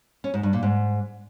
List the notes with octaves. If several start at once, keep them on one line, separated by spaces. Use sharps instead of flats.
C#4
G#2
G2
A#2
G#2